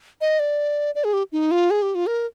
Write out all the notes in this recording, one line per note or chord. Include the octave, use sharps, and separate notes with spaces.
D#5
D5
D5
G#4
G4
D#4
F4
G#4
G4
F4
A#4